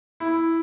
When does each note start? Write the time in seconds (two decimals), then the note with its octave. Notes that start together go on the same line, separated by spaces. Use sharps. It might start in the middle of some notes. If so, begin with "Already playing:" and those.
0.20 E4